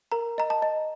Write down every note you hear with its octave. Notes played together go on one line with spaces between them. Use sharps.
A#4 A#5
D#5 A#5
A5
D#5